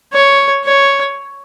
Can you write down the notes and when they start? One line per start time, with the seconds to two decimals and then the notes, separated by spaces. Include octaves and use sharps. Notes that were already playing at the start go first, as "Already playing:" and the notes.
0.13 C#5
0.65 C#5